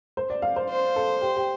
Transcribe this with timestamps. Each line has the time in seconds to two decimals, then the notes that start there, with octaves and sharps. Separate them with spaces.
0.17 C5
0.30 D5
0.42 F5
0.56 C5
0.69 C5
0.96 A4
1.22 G4
1.36 G4